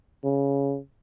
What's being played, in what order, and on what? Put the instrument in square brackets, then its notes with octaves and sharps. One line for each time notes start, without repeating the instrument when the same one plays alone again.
[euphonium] C#3